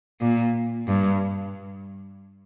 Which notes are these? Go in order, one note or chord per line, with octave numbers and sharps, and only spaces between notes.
A#2
G2